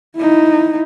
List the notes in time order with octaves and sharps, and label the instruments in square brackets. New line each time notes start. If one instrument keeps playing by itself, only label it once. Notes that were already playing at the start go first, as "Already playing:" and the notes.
[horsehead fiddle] D#4 E4